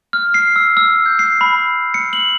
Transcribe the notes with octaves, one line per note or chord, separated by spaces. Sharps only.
F6
C7
E6
E6
G6
C7
B5
C#7
F#7